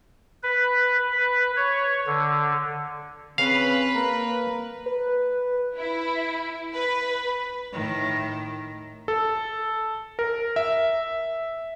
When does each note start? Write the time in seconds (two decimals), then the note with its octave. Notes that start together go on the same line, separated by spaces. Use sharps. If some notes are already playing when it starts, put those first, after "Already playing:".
0.43 B4
1.12 B4
1.56 C#5
2.07 D3
3.38 C#3 C4 B4 F5
3.95 A#3 A#4
4.86 B4
5.76 E4
6.74 B4
7.72 A2 D#3
9.08 A4
10.19 A#4
10.56 E5